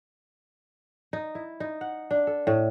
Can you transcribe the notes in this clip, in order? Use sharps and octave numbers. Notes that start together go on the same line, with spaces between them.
D#4
E4
D#4
F#5
D4
A4
A2